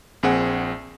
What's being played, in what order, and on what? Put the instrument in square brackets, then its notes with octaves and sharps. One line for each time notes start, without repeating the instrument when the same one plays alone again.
[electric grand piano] A#1 C4 G#4 F#5